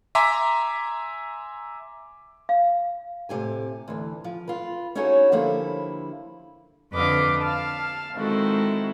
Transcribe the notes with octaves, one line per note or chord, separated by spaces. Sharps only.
E5 G#5 A#5 C6 D6 B6
F5
A2 C3 G4 G#5
D2 E3
F3
F4 B4
C#4 D#4 E4 F#4 G#4 C#5
D3 F3 G3 A#3 E4
F2 D3 B4 D#5 F5 D6
F5 A5
D#3 G#3 C4 E4 F#4 A4